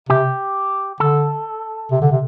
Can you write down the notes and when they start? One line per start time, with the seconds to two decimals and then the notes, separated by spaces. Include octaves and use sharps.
0.09 C3 G4
1.00 D3 A4
1.91 C3
2.02 D3
2.11 C3